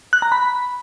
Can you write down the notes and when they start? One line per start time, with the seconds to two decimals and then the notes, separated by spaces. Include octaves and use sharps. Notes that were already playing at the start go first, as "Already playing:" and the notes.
0.13 F#6
0.22 A#5
0.32 B5